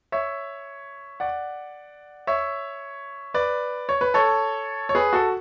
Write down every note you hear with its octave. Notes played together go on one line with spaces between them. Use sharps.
C#5 E5
D5 F#5
C#5 E5
B4 D5
C#5
B4
A4 C#5
C#5
G#4 B4
F#4 A4